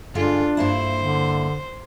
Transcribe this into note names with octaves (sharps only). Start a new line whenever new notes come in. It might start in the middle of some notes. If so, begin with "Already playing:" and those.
G2 D3 G#3 D4 F4
G2 A#3 E4 C5
D3